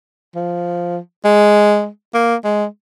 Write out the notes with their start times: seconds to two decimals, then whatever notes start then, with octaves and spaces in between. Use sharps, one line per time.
0.35 F3
1.24 G#3
2.14 A#3
2.44 G#3